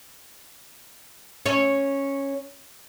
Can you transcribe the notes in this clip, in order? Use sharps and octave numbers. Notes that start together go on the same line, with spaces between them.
C#4 C#5